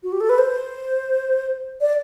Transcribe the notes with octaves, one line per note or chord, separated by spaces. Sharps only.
F#4
G4
A4
B4
C5
D5